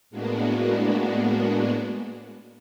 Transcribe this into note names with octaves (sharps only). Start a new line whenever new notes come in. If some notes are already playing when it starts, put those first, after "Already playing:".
A2 G#3 A#3 B3 D4 F#4